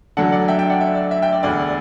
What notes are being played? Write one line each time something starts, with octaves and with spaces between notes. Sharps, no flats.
D2 D3 F#3 A3 D4 F#5 A5
D5 F#5
E5 G5
E5 G5
D5 F#5
E5
D5
E5
E5 G5
D5
E1 D2 D3 D5